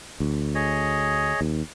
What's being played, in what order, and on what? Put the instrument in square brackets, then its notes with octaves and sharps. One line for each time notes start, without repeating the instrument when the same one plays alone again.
[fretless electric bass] D2
[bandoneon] G#4 C#5 D#5
[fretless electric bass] D#2